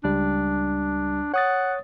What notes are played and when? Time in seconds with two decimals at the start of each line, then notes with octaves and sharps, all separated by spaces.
0.04 C#2 G3 D4
1.34 C#5 F#5 D#6 A6